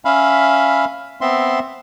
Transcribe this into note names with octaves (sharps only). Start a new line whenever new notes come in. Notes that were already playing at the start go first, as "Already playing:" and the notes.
C#4 E5 F5 B5
B3 C4 E5 C6